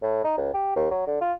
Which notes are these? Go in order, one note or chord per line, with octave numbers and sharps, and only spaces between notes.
A2
D#4
C#2
G4
D#2
F#3
D3
F4